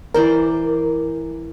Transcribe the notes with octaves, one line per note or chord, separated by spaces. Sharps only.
E3 A#4 C5 D5